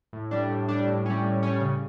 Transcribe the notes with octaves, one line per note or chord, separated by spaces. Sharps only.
A2
G3 D4
A2
G3 D4
A2
G3 C#4
A2
G3 C#4
C#3